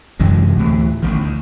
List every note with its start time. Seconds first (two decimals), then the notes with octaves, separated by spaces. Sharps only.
0.20 F#2 C3 E3 G#3
0.57 D2 A2 E3
1.02 A1 D#3
1.19 D2